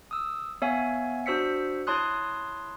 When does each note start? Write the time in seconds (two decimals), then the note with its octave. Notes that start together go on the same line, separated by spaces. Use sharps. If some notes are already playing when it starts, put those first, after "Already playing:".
0.11 D#6 E6
0.62 B3 C#5 E5 F5 G#5
1.26 D4 F#4 C5 E6 B6 C#7
1.87 E4 C#5 A5 C6 D#6 F#6